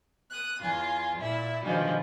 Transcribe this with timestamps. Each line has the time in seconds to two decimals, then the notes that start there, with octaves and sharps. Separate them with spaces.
0.30 D#6 F#6
0.61 E2 F4 G#5
1.18 A#2 E4 E5
1.63 B2 D3 D#3 F3 G3 G#3